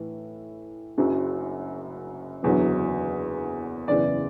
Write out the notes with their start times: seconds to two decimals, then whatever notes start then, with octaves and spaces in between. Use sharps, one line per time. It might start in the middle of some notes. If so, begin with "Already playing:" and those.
Already playing: A2 E3
0.98 F#1 F#2 C#3 F#3
2.43 F#1 E2 D3 F#3
3.88 F#1 E2 C#3 E3 D5